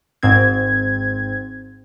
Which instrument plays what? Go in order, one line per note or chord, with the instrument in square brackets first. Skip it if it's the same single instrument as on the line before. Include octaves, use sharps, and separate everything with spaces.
[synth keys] G#1 G#2 C4 G#6